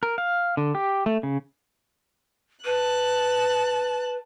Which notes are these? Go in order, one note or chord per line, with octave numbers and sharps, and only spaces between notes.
A#4
F5
D3
G4
A3
C#3
B4 A5 F#6